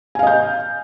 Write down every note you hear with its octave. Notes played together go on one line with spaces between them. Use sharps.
D#5 F5 G#5 G6